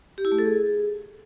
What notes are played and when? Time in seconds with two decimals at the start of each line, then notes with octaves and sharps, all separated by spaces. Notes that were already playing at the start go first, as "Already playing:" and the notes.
0.18 G4
0.25 E4
0.32 A3
0.38 A4
0.45 G#4